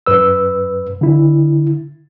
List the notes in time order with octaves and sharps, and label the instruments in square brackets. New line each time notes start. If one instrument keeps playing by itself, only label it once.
[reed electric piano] F#2 B4 E6
D3 E4